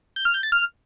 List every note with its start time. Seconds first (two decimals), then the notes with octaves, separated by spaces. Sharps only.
0.16 G6
0.25 F6
0.34 G6
0.43 A6
0.52 F6